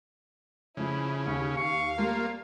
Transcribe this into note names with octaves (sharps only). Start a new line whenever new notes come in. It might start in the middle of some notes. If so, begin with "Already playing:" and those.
F2 C#3 A3 E4
D#2 C#4
F5 C#6
G3 A3 A#3 F4